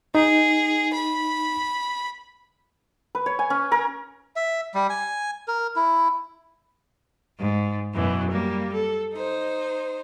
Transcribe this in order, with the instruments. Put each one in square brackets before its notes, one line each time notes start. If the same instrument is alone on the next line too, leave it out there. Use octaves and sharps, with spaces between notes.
[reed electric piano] D#4 [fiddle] G#4
[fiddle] B5
[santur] B4
C#5
G#5
C#4
A#4
[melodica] E5
G3
G#5
A#4
E4
[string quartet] G#2
F#2 B2 E3
G3 A#3
A4
D#4 C5